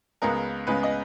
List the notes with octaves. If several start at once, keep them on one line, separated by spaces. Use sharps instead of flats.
C#2 C#3 G#3 B3 A#4
C#2 C#3 G#3 B3 B4
D#5